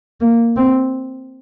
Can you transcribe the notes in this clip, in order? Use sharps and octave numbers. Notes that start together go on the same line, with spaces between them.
A#3
C4